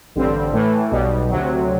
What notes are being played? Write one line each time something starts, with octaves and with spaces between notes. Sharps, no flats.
A1 G2 D3 G3 C4
A2 E3 A3
B1 B2 G3
D2 C3 F#3